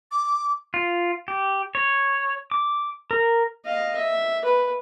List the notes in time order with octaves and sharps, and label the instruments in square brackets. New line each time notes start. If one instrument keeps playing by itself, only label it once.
[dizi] D6
[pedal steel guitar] F4
G4
C#5
D6
A#4
[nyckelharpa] D#5 F5
E5
B4